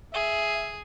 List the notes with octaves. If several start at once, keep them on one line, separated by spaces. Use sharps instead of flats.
G#4 E5